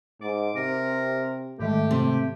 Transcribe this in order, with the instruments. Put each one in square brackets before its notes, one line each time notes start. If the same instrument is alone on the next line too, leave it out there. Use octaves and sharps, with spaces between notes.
[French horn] G#2 [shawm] D6
[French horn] C3 [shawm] A#4
[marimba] G#2 D#3 G#3 [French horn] A3 [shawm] G4
[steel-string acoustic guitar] C3